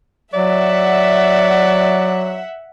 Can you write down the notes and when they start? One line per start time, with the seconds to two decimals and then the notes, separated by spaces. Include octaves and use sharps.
0.34 F#3 D5 E5 F#5